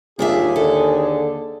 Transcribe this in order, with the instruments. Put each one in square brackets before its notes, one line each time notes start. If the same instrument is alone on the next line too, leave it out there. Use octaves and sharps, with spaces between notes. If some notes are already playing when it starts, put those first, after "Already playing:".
[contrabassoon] D#2 [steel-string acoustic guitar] D#3 D4 E5 [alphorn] F4 [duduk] G#4
[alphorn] D3 [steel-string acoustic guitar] A4